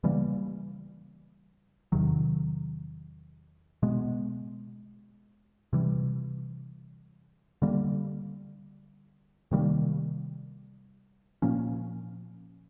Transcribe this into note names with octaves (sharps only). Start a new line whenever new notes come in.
C#3 E3 G3 A#3
E2 C3 D#3 F#3
B2 G#3 B3
C3 E3 G3
D3 G3 A#3
C3 D#3 G3 A#3
A#2 F3 A#3 C#4